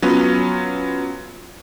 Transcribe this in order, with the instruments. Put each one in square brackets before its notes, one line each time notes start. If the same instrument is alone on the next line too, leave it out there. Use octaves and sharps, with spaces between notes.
[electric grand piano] F#3 B3 C#4 F4